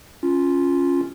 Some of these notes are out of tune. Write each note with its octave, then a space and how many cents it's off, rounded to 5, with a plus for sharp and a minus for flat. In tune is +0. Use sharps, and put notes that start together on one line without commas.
C#4 +0 F4 +0